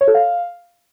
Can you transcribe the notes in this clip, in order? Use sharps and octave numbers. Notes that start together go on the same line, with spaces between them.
C#5
A4
F5